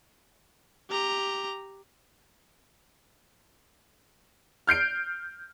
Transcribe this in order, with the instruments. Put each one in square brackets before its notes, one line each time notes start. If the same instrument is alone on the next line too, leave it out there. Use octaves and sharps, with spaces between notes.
[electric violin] G4 A#5
[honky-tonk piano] F6 G6 C7 D7